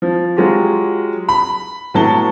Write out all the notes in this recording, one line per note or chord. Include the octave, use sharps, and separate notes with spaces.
F3
F#3 G#3 F4 G4
B5
A2 F#3 B3 A5 G7